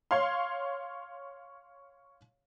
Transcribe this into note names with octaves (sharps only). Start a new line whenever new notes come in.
C#5 F5 C6